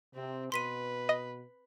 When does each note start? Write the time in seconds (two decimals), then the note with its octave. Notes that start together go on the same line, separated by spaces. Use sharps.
0.15 C3 C4
0.52 B2 B4 C6 B6 D#7
1.09 D#5